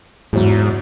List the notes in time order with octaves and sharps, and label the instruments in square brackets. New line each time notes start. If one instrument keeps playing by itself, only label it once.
[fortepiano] E2 F#3 [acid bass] G#2